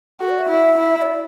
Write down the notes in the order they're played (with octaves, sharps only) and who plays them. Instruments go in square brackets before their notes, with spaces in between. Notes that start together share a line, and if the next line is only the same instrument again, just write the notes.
[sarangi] F#4 [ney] A4
[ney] D5
E5
[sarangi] E4
E4
[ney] C#5
D5